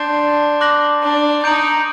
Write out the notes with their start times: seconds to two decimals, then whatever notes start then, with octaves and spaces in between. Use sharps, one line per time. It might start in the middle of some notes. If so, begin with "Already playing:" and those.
Already playing: D4 C6 G6 C7
0.61 D6 F#6 A#6 F#7
1.02 D4
1.43 D#4 G6 D7 F#7